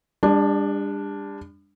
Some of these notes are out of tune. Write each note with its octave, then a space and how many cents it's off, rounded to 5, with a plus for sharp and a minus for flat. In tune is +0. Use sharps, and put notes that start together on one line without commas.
G3 +45 D4 +0